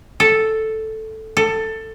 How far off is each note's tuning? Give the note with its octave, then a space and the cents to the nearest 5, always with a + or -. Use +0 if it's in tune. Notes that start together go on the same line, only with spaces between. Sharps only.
A4 +0
A4 +15